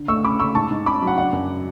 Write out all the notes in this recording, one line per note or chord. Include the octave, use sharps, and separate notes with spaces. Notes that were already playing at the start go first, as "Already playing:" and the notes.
Already playing: D3
A3 C#6 E6
C#4 B5 D6
A3 C#6 E6
G#2 A5 C#6
G#2
C#4 B5 D6
F#3
F#5
D4 F#5
F#2